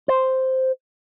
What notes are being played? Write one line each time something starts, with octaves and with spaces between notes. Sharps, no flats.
C5